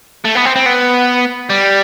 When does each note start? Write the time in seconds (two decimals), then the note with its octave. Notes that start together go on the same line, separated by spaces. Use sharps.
0.25 A3
0.35 B3
0.45 C4
0.56 C4
0.66 B3
1.49 G3